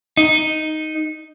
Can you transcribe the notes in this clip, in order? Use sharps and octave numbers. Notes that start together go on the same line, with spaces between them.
D#4